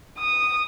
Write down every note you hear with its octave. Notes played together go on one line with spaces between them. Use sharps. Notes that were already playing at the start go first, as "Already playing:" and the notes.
D#6